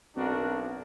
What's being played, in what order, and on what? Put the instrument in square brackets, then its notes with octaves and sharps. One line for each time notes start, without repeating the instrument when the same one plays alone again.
[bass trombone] B1 [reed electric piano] C4 [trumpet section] D4 F#4 A#4